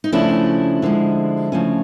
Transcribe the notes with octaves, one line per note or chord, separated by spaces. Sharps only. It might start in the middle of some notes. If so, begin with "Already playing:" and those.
D#4
C#3 F3 A3 C#4 D4 E4
D3 F3 G#3
C#3 F3 A3 C#4